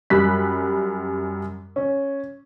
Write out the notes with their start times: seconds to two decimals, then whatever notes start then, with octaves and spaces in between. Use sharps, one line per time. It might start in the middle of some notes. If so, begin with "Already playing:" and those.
0.10 F#2 G3 B5 F#6 B6
1.76 C#4